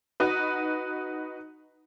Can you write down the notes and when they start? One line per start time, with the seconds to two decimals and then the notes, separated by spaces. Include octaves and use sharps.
0.20 D#4 F#4 B4